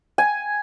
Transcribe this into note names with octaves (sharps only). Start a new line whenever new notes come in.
G#5